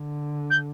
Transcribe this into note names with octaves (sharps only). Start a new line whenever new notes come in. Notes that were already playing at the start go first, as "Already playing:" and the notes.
Already playing: D3
G6